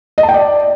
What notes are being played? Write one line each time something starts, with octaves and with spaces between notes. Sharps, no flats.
D#5
A5
G5
D5